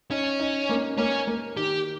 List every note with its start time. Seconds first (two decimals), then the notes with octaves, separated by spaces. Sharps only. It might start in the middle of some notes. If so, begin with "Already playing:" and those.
0.10 C#4 D#4
0.40 D#4
0.69 A#3
0.98 A#3 C#4
1.27 A#3
1.57 D#3 G4